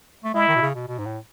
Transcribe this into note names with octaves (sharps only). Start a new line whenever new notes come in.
A3
G#3 E4
D#3
B2
C#3
B2
B2
G#2
A2